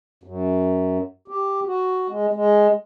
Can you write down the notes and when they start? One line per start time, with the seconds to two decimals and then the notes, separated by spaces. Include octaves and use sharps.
0.23 F#2
1.28 G4
1.66 F#4
2.09 G#3
2.34 G#3